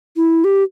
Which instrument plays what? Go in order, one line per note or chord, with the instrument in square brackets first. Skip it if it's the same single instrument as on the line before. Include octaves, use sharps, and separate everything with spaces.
[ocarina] E4
G4